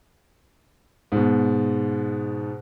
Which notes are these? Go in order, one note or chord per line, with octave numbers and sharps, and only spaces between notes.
G#2 B2